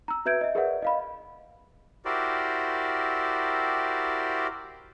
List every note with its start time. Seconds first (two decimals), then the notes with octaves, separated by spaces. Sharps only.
0.08 A#5 E6
0.26 F#4 B4 E5 G6 G#6 D7
0.41 D#5 E5
0.55 G#4 A#4 B4 D5 E5 F#5
0.82 D#5 F5 B5
2.05 E4 F#4 G4 A#4 C5 D5